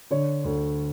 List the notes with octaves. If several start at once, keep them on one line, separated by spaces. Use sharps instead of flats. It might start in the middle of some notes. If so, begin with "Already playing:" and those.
D3 C#5
D2